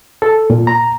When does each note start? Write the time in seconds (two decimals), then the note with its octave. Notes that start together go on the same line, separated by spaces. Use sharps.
0.22 A4
0.50 A#2
0.67 A#5